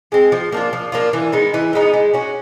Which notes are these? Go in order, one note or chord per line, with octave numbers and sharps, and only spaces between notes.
G#3 C4
F3
A#3 D4 F4
F3
A#3 D4 F4
E3
G#3 B3 D#4
E3
G#3 B3 D#4
G#3
C#4 F#4